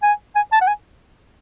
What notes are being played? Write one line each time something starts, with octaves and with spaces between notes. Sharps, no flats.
G#5
G#5
A5
F#5
G#5